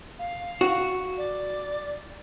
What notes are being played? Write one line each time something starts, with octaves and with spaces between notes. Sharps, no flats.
F5
F#4
D5